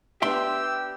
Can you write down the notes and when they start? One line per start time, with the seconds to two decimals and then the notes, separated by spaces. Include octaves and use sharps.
0.22 B3 D4 G4 B4 E5 G5 C6 E6